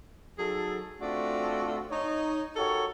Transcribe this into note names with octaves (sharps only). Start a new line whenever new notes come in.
F#3 D#4 G#4 A4
A3 C4 D4 F4 F#4
D#4 C#5
F#4 G4 A4 A#4 C#5